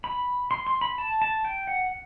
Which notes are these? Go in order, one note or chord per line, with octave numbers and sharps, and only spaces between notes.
B5
C6
C6
B5
A5
A5
G5
F#5